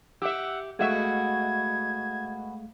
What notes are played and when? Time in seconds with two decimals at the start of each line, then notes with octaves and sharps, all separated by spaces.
0.22 G4 E5 F#5 E6
0.79 B2 G#3 A3 F#4 E5 F5 G#6